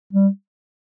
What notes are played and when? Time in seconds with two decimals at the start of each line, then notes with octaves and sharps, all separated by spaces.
0.13 G3